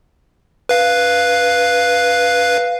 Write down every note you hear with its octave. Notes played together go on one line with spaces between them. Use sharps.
B4 F5